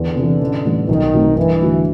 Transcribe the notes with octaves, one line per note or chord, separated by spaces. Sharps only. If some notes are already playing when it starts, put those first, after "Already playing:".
Already playing: E2 D3
C3
E3
A1
A2 E3 G3
B1 D#3
B2 F#3 A3 C4
G2 E3
D3 F#3 A3